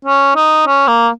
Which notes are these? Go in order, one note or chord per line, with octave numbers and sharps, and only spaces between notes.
C#4
D#4
C#4
A#3